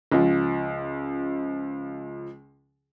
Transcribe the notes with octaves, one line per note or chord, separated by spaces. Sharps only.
C#2 F3